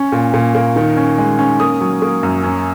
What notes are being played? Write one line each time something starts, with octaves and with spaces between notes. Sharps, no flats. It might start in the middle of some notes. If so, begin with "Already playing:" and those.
Already playing: C#4
A#2
A#2
A#3
D#3
C#4
G#3
C#4
A#3 D#6
F#3
A#3
F#2
C#4